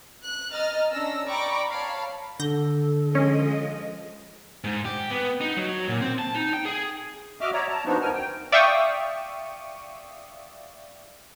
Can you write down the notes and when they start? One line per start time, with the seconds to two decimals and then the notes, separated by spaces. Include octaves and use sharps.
0.22 F#6
0.52 D#5 A#5 F6 A6
0.92 C#4 D4 E6 A#6
1.28 D5 G5 A#5 B5 C#6 D6
1.69 C#5 F5 A5 B5
2.40 D3 A4 G6 A#6
3.15 F3 G#3 C#4 D#5
4.64 G#2
4.85 G4
5.11 B3
5.41 D#4
5.57 F#3
5.89 A#2
6.01 C4
6.19 A5
6.35 D#4
6.53 G5
6.65 G#4
7.41 F#4 D#5 E5 D6 F6
7.53 C#5 D5 E5 A#5
7.68 A5 A#5
7.85 F3 B3 C4 D4 D#4 F#4
8.02 D2 A#4 G#5 F6
8.13 G5
8.52 D5 E5 F5 G5 C#6 D#6